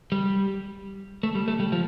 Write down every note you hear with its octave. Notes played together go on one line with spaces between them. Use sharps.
G3
A3
G3
A3
G3
F3